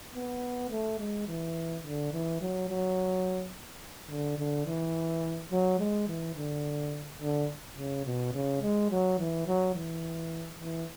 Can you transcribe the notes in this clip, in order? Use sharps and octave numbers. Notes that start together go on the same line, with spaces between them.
B3
A3
G#3
E3
D3
E3
F#3
F#3
D3
D3
E3
F#3
G#3
E3
D3
D3
C#3
B2
C#3
G#3
F#3
E3
F#3
E3
E3